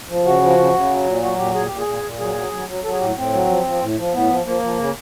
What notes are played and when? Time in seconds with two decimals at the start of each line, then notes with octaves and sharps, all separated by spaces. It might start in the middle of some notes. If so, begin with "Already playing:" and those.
0.09 F3
0.25 C#3 F#4
0.42 F3
0.58 C#3
0.74 C#3
0.90 F#3
1.06 A#2
1.22 F#3 F#4
1.38 A#2 G4
1.54 A#2 G#4
1.67 A#2 G4
1.78 G#4
1.87 A#2
2.03 A#2
2.19 F#3 G#4
2.36 F#3
2.52 F#3
2.68 F#3
2.84 F#3 A4
2.92 G#4
3.00 A2 G4
3.08 F#4
3.16 A2 C4
3.33 F#3
3.48 F3
3.65 F3
3.81 A2
3.98 F3
4.13 A2 B3
4.29 F3
4.46 F3 A#3
4.62 F3
4.78 C#3